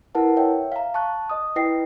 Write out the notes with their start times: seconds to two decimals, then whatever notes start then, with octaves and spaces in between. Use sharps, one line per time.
0.15 E4 A#4 B4 F#5 A5
0.37 C#5 E5 G5
0.72 F5 A#5
0.94 A5 C#6 F#6
1.30 D#5 D#6
1.56 E4 B4 D#5 G5 A#6 C7